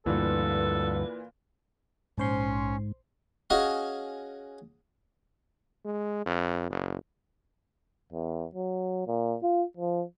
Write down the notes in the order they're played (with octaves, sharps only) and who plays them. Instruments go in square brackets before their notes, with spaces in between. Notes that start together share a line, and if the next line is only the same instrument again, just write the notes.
[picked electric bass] D2 G2 [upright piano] A#2 E3 [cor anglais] A4 [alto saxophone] B4
[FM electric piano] A#1 C5 C6 [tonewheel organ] G#2 [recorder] C#4
[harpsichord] C#4 F#4 G#4 C#5 D#5 F5
[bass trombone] G#3
F2
F#1
[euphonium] E2
F#3
A#2
F4
F3